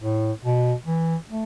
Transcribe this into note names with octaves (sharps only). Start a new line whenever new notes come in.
A2
B2
E3
A3